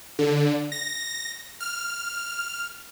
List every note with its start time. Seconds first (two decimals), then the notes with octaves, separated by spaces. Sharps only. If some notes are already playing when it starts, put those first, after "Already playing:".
0.19 D3
0.72 A#6
1.60 F6